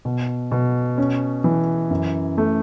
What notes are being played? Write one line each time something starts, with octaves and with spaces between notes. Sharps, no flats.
B2
B2
C#4
E3
F#2
A3